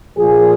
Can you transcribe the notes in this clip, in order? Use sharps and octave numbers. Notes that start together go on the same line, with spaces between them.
A#2 F3 G#4